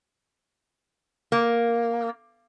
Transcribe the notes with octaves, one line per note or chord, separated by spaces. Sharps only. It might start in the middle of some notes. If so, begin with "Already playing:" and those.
A#3